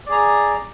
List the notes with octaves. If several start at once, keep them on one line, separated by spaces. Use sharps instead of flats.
G#4 D5 A#5